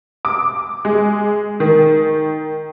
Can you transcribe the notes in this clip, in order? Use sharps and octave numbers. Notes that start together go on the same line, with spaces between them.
D6
G#3
D#3